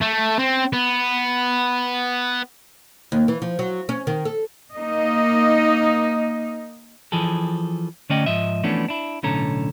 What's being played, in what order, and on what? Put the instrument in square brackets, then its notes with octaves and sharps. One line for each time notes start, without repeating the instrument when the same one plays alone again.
[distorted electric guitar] A3
C4
B3
[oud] D#2
E3
F3
F#3
C#4
D#3
A4
[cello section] A#3 D#4 D#5
[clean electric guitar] E3 F3 G#4 A4
D3 A3 C#4 D5 D#5 G5
G#2 F3 D#5 E5
E3 F3 A3 B3 C#4 D4
D4 E4
B1 A2 D3 C#4 A4 A#5